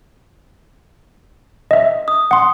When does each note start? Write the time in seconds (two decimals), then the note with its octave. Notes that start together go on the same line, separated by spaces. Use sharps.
1.71 D#5 E5
2.08 D#6
2.31 F#5 C6